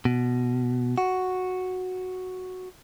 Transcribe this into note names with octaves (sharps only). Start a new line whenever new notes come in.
B2
F#4